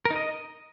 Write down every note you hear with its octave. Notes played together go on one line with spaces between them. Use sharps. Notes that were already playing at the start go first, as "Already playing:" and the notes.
A#4
D#4
D#5